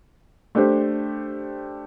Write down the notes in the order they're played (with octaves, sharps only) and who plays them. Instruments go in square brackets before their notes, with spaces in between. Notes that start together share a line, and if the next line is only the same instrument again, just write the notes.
[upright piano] A3 D4 G4 C5